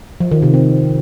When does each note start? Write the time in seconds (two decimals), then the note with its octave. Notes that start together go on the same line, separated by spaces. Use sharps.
0.20 F3
0.31 D#3
0.43 C3
0.54 C4